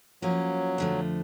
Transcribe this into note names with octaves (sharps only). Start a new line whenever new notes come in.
F3 F#3 A#3 C#4
F2 D3 F3 A3